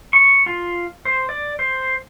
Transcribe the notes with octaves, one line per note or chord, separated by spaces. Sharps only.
C#6
F4
C5
D5
C5